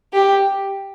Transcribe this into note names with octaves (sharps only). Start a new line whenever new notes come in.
G4